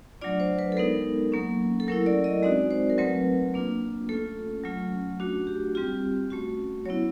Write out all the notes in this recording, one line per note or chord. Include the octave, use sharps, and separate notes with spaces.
F#3 A3 D4 F4 D5
C5
B4
A4
G#3 B3 D#4 A#4
F#3 A#3 C#4
A4
F#3 A3 C#4 E4 A#4
D5
D#5
G#3 C4 D#4 F#4 D5
C5
A#4
F#3 A3 C4 B4
A#3 D4 F4
A3 C#4 F4 A4
F#3 A3 C#4 F4
A3 D4 F#4
G4
G3 C4 F4 G4
A3 C#4 F#4
F#3 B3 E4 C#5